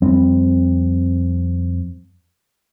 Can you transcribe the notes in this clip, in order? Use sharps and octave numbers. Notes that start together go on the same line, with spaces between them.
F2 G3 C4